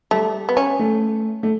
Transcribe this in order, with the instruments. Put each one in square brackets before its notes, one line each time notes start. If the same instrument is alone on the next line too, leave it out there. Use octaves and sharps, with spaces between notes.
[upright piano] G3 [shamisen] A3
[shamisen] B3
C#4
[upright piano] A3
A3